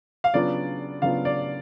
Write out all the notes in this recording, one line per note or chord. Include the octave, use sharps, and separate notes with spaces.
F5
C#3 F#3 B3 D4 F4 D5
C#3 F#3 B3 D4 F4 F5
D5